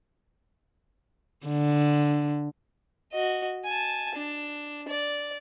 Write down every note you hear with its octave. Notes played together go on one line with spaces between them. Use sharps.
D3
F#4 D#5
G#5 A5
D4
D5